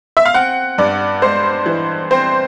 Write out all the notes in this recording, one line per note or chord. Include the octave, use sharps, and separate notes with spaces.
E5
F5
C4 F#5
G2 D5
G#3 C5
E3
C4 C5